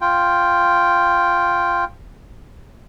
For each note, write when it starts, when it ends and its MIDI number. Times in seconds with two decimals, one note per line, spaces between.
0.01 1.85 65
0.01 1.85 79